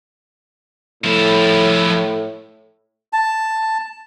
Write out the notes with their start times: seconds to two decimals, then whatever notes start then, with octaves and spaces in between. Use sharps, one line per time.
1.04 A2 F3 E4
3.13 A5